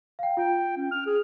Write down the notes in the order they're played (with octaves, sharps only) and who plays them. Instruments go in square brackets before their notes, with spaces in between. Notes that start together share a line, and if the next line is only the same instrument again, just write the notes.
[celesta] F5 G5
[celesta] F4 [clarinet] G5
[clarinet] C#4
F6
G#4